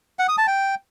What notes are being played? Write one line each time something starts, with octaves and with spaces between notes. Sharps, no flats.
F#5
D#6
A5
G5